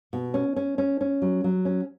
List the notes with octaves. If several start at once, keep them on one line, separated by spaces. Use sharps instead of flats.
B2
C#4
C#4
C#4
C#4
F#3
F#3
C#4